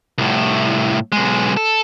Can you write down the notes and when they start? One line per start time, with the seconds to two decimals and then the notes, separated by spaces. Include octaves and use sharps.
0.18 C2 A2
1.12 B1 G#3
1.57 A4